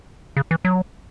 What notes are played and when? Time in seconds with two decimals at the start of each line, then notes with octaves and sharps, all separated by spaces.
0.37 C#3
0.51 E3
0.65 F#3